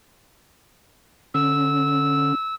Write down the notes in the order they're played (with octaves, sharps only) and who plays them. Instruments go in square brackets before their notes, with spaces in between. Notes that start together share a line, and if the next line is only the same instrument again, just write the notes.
[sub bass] D3 [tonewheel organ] C#4 [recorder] E6